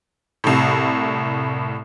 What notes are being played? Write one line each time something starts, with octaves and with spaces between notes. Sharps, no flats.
C2 A2